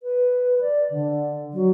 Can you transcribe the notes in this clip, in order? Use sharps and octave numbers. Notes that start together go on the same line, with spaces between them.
B4
D5
D3
F#3